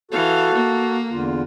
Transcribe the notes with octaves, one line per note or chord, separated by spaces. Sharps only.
E3 F#4 A4 F5
A#3
E2 D3 F4